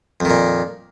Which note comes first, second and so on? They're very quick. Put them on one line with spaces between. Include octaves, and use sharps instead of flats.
F2 D#3 A#2